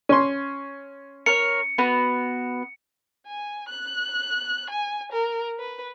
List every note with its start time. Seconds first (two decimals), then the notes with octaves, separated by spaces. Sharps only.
0.09 C#4 C6
1.26 A#4 C#5 C#7
1.78 B3 F#4
3.27 G#5
3.69 F#6
4.70 G#5
5.12 A#4
5.59 B4